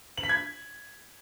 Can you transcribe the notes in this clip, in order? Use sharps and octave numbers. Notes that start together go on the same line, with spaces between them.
F#7
B6
G#6